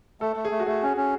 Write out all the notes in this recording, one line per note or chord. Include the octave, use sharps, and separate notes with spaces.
A3 A4
A3
G#4
A3
F#4
A3 G#4
C#4
C#4